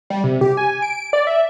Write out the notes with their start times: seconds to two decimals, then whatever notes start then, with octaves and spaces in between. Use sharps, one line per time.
0.10 G3
0.24 C3
0.41 G4
0.57 G#5
0.82 D7
1.13 D5
1.27 E5